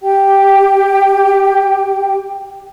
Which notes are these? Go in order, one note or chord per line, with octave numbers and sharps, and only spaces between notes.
G4 G5